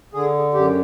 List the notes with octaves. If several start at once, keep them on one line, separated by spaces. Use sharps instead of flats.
D3 G#4
F#2 G4